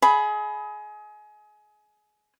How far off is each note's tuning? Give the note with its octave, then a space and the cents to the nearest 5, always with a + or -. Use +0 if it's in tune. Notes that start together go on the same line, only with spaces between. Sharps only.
G#4 +25 D#5 +30 B5 +0